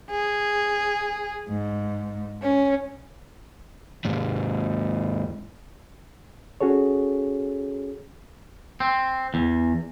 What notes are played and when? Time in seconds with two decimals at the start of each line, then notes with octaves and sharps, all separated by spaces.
0.11 G#4
1.48 G#2
2.42 C#4
4.05 D#2 G#2
6.61 C#4 F#4 G#4 A4 C#5
8.80 C4
9.34 E2